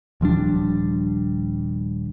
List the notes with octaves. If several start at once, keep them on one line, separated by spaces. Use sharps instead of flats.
D#1 F3 G3 D4